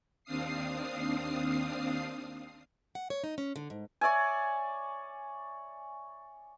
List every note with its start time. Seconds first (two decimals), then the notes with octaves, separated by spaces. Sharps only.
0.24 D#2 C4 D4 F5 D#6 C7
2.95 F#5
3.10 C#5
3.24 D#4
3.38 C#4
3.56 D3
3.70 G#2
4.01 C#5 D5 E5 G#5